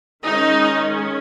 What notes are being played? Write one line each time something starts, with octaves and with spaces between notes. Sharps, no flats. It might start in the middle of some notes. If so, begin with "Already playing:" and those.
D#3 G#3 C#4 D#4